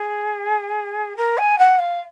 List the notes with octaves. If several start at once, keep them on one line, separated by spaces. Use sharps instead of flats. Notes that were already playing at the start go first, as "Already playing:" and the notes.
Already playing: G#4
A#4
G#5
F#5
F5